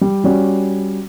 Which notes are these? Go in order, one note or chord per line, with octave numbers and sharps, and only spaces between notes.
G3
G3 C#4 F#4 D5